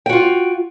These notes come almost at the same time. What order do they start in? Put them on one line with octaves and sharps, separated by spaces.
G5 F#4 F4